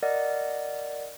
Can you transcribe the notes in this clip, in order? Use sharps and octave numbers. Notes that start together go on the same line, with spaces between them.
A#4 D5 D#5 F#5